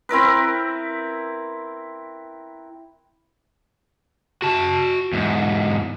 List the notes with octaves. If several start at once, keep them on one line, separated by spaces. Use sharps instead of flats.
C4 E4 A#4 B4
F#4 A5
E2 G#2